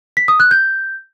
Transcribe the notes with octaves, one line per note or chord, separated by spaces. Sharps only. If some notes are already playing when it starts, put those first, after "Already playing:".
B6
D#6
F#6
G6